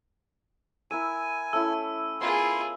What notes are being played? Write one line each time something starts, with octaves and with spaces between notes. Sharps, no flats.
E4 A#4 G#5 E6 D#7
A3 C#4 E4 E6
B3 E4 F4 G#4 A#4 B5 C6